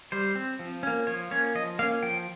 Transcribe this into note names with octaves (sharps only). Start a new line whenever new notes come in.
G3 C5
C4
F3
A#3 C#4
F3 C#5
A#3 C#4 C#5
F3 D#5
A#3 C#4 F5
F3 G5